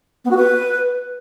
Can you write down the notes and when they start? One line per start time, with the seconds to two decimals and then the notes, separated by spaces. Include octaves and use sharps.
0.25 B3
0.31 F#4
0.37 B4